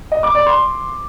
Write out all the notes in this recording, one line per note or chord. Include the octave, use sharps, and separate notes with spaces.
D#5
D6
D5
C6